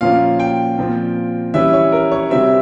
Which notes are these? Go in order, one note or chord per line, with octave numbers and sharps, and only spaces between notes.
A#2 F3 A#3 C#4 F5
G5
A#2 F3 C4
E3 G3 C#4 E5
C#5
A#4
C#5
C3 G3 C4 E5